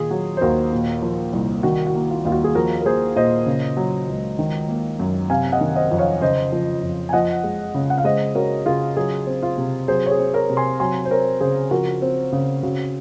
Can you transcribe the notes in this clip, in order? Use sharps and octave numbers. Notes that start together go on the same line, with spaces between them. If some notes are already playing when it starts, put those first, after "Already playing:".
Already playing: A#2 D#3 F4 G#4
F#3 F#4
C5
D#2 F#4 A#4
A#2
F3
C2
D#3 F#4
F#4
A#3
F4
D#2 F4
F#4
G#4
F3 F#4 A#4
A#4
A#3 G#4 C5
A#2 C5 D#5
C#3
F#3
C#2
D#3
A#3
F#2
C3 F5 G#5
D#5 F#5
D#3
C5 D#5
F2
C#5 F5
C#3 C5 D#5
F3
F2
G#5
F3 D#5 F#5
G#3
C#3
F#5
F5
G#3 C5 D#5
C#4 F#4 A#4
C#3 F4 G#4
F#3 F4 G#4
C4
F4
C3
F#3 G#4 C5
C#5
G#4 C5
C4
A#4 C#5
C3
G#5 C6
F#3 G#5 C6
C5
C4 A#4 C#5
C#3 G#4 C5
F3 F#4 A#4
C4
C#3
C#3 F#4